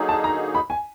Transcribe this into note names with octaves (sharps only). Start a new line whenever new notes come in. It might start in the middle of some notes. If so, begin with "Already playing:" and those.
Already playing: D3 F#3 A#3 D#4 G#4
A5
A#5
B5
G#5